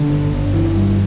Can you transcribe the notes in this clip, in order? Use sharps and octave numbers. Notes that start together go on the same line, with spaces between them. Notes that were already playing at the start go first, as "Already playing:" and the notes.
Already playing: D3
G1
G1
E3
G2